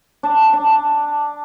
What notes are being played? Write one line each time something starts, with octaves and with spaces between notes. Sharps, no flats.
D4
D4